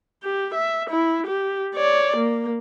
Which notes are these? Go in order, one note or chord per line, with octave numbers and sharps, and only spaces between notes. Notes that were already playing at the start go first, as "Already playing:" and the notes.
G4
E5
E4
G4
C#5 D5
A#3